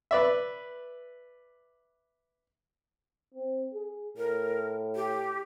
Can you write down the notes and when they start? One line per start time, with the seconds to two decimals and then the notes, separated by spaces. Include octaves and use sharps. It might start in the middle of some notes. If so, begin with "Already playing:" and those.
0.11 B4 D5 E5
3.34 C4
3.74 G#4
4.17 A2 A#4
4.96 G4